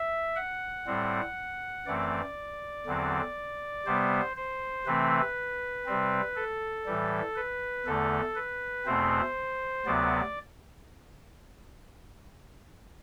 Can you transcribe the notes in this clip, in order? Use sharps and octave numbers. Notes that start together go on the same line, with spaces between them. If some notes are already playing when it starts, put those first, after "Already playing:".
Already playing: E5
F#5
A2 G3 C4
F#2 E3 A3 C4 D5
E2 D3 F#3 C4
C3 G3 B3 C5
C5
C3 E3 A3 C4 B4
C3 G3 C4
A4
A2 E3 G3
B4
E2 D3 A3 A4
B4
E2 B2 A3 C4 C5
D2 C3 F#3 B3 D5